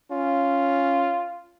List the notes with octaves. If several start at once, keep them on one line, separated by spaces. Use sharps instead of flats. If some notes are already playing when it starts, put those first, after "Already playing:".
C#4 F4